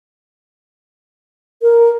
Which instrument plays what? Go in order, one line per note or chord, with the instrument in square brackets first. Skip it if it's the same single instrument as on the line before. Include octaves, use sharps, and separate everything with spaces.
[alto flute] A#4